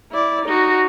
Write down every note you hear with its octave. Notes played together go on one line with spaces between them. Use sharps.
E4 D5
D#4 F#4